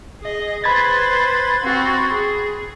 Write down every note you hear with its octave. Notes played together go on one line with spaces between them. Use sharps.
G#4 D#5
B4 C5 B5 G#6 A6
C4 F#4
G#4